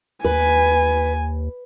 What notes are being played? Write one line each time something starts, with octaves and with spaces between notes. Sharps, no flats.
D#2 B4 G#5